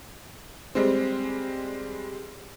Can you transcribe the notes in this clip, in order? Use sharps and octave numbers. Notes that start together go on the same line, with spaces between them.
G3 G#3 C4